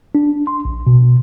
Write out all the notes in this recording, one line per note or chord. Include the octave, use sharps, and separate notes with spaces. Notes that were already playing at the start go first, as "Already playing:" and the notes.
D4
C6
A#1
B2